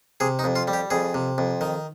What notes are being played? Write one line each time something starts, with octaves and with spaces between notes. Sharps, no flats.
C3 G#4
D#4
F2
F4
G3
G4
F2 G#4
C3
F2
D#3